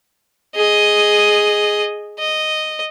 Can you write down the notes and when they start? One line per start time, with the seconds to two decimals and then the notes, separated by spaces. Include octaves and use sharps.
0.55 G#4 D#5
2.18 D#5